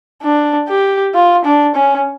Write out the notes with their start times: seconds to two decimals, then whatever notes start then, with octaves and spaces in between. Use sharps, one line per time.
0.23 D4
0.69 G4
1.14 F4
1.45 D4
1.75 C#4